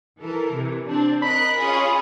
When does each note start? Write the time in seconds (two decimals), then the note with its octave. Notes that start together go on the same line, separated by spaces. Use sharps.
0.20 E3 A4 A#4
0.53 C3 E3
0.87 C4 D4
1.22 A#4 D#5 B5 F#6
1.57 C#4 F4 G#4